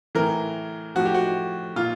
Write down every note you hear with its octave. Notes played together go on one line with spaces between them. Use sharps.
A2 E3 A#4
A2 F3 F#4
G4
F#4
A#2 F4